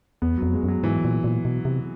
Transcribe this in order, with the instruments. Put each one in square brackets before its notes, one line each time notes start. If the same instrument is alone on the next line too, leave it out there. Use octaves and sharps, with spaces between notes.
[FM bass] E2 [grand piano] B3
[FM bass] F2 [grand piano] F#3
[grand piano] G#3
[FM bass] F#2 [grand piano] F#3
[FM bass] G#2 [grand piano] E3
[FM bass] A#2
A#2
B2
C3